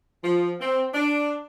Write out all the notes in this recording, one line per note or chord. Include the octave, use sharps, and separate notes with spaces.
F3
C4
D4